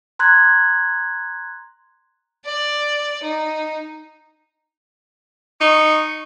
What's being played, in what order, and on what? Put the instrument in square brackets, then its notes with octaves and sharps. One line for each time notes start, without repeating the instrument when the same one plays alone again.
[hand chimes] A#5 C6 F#6 G#6
[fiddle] D5
D#4
[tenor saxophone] D#4 [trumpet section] C#6